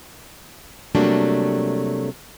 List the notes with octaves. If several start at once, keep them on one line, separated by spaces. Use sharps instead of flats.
C3 F#3 G3 A3 A#3 D4